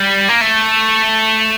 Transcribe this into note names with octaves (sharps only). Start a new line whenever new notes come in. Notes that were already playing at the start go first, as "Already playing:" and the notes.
Already playing: G3
A#3
A3